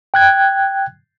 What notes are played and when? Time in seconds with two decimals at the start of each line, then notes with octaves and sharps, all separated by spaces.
0.14 G5 F#6 G#6